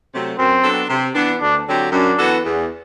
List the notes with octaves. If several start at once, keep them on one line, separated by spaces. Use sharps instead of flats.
C3 F#3 A3 C4
F#2 C4
F#3 B3 D4 A4
C3
E3 B3 D4
D2 D4
D3 F#3 C4 G4
F#2 D4
E3 B3 F#4 A4
E2